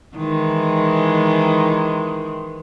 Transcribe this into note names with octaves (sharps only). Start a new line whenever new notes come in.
D#3 E3 G#3